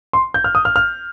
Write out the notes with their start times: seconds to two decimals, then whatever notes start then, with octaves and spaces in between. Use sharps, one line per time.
0.13 C6
0.34 G6
0.44 F6
0.55 D#6
0.65 F6
0.76 F6